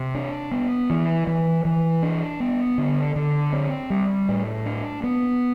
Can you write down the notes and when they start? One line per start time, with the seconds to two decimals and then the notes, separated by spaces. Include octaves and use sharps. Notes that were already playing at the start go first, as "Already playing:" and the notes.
Already playing: C3
0.14 D4
0.51 B3
0.90 E3
1.27 E3
1.65 E3
2.03 D4
2.40 B3
2.78 D3
3.16 D3
3.53 C4
3.90 G3
4.29 A2
4.66 D4
5.03 B3